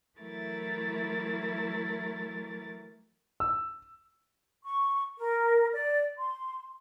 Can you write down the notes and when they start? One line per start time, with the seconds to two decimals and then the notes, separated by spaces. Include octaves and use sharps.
0.19 E3 F#3 A3 E4 A#4 A6
3.40 E6
4.64 C#6
5.19 A#4
5.73 D5
6.18 C6